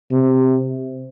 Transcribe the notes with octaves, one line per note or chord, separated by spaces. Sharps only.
C3